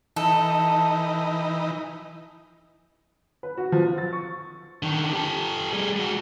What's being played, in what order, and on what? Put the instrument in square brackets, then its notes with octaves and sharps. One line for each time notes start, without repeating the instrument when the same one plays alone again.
[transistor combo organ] E3 D#4 [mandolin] A4
[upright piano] B4
F#4
F3
F4
A6
C#6
[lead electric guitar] D3 D#3
G4 A4
G3 G#4
G#3 F#4